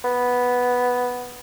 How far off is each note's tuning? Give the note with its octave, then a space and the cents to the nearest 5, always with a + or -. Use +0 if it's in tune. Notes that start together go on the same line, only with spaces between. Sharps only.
B3 +0